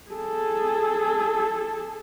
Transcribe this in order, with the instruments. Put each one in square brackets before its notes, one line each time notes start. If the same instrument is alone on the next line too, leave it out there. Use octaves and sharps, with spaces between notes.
[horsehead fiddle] G#4 A4